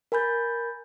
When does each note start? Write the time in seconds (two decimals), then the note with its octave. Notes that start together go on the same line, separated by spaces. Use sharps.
0.12 A#4 G#5 B5 G6 A6